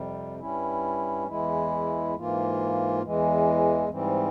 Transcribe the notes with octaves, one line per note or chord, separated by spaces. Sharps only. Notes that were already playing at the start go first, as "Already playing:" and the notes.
Already playing: F2 C3 G3
G2 G3 C#4 E4
E2 E3 G#3 E4
G#2 E3 A#3 F4
E2 E3 G#3
G#2 E3 G3 C4